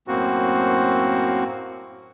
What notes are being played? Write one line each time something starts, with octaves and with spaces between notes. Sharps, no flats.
F#2 A2 A#3 C4 F#4